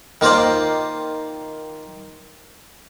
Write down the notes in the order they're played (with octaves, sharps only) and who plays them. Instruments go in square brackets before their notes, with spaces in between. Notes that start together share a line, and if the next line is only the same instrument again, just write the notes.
[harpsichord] D#3 A#3 F4 C5 D5